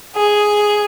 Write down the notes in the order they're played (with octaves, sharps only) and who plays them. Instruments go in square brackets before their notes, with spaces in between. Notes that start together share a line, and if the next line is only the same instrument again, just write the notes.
[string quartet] G#4